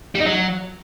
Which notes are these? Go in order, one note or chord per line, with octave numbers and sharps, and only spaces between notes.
G3
D#4
F#3